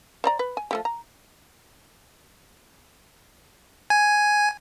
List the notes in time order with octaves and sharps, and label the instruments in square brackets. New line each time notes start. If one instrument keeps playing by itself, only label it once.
[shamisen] C5 D5 A#5
B4
G#5
F3 A3 G4
A#5
[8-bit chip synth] G#5